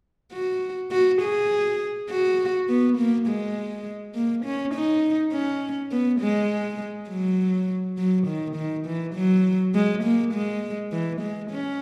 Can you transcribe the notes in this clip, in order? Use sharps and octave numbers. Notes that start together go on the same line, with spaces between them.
F#4
F#4
G#4
F#4
B3
A#3
G#3
A#3
C#4
D#4
C#4
B3
G#3
F#3
F#3
D#3
D#3
E3
F#3
G#3
A#3
G#3
E3
G#3
C#4